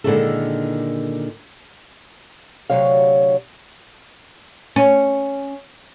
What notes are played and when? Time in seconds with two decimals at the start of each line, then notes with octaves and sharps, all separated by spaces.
0.04 A#2 D3 D#3 G#3 E4 A4
2.70 D2 C3 F#3 C#5 F5
4.76 C#4